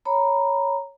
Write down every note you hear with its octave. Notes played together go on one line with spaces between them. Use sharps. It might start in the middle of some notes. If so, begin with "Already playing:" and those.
C#5 A#5 B5